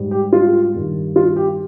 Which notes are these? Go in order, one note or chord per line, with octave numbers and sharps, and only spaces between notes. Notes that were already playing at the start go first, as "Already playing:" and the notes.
Already playing: G#2 G3
G4
F4
G2 D#3 G3
F4
G4